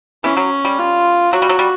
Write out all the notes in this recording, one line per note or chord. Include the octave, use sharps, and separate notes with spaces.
E3 C#4
F#3
G3
F4
F#3 F#4
G3
F#3
G3